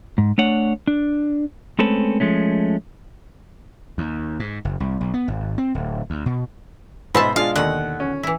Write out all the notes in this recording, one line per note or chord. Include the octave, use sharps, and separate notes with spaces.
G#2
A3 D4 C#5 F#5
D4
G#3 A3 C4 C#4 A4 B4
F3 G#3 A3 C#4
D#2
G#2
F#1
C2
B1
B3
G#1
C4
D1
D2
B2
G#2 B2 C5 E5 A5 B5 E6
G#3 D4 F4 F5
D#2 D3 D#3 F#5
C#4
E3 E4